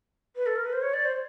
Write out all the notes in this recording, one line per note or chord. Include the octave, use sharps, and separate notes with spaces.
B4
A4
A#4
B4
C5
C#5
D5
C5